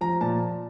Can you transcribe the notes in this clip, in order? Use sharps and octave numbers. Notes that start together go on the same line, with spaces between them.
F3 A#5
A#2 A5